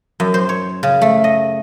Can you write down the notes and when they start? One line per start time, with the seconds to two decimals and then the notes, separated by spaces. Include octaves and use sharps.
0.20 F#2
0.34 C5
0.49 C#5
0.83 C#3
1.01 A3
1.24 D#5